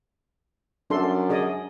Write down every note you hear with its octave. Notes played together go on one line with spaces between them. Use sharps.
F#2 D4 A4 C6
G#4 D5 D#5